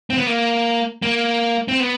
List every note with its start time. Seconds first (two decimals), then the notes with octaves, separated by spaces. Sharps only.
0.10 C4
0.18 B3
0.26 A#3
1.02 A#3
1.68 C4
1.80 B3